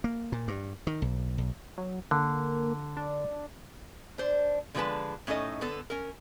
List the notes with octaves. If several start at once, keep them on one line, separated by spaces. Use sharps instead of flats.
A#3
A#2
G2
D#3
B1
B1
F#3
D3 A#3
D4
D4 C5
D3 F3 G#3 F#4 B4 A5
A2 C#4 D#4 A4 D#5
D3 B3 A4
C#4 A#4